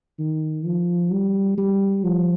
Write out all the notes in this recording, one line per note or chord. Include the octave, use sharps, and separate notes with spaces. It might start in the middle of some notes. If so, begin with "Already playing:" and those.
D#3
F3
G3
G3
F3